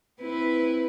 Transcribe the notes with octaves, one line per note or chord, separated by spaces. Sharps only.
C4 E4 B4